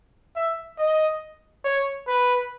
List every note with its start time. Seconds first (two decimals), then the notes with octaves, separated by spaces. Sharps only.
0.36 E5
0.79 D#5
1.65 C#5
2.08 B4